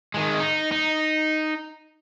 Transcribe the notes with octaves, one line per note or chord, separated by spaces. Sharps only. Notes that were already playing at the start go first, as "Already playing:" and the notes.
D#3 G#3
D#4
D#4